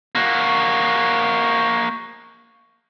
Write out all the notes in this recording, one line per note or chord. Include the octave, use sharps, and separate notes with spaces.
A#3 F#4